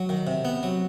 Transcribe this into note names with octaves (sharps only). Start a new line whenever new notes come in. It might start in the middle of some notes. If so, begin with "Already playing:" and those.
Already playing: F#3
D#3
C3
B3
F#3